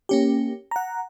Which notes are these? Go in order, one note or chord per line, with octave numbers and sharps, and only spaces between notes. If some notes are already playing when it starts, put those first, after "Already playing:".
A#3 C#4 G4
F#5 A#5